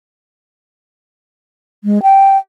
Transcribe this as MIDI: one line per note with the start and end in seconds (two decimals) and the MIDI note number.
1.84 2.02 56
2.02 2.37 79